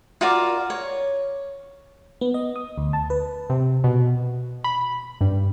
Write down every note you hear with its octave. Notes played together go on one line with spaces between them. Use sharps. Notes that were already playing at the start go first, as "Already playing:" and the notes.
F4 F#4 A#4 D5
C#5
B3
D#5
D#6
D2
A5
B4
C3
B2
B5
G2